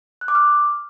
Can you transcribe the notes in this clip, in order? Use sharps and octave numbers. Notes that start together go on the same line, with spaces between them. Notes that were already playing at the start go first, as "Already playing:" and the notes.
F#6
D6
F6